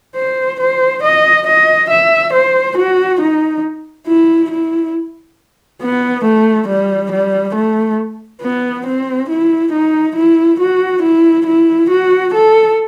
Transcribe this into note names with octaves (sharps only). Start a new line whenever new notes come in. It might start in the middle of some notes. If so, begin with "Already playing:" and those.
C5
C5
D#5
D#5
E5
C5
F#4
D#4
E4
E4
B3
A3
G3
G3
A3
B3
C4
E4
D#4
E4
F#4
E4
E4
F#4
A4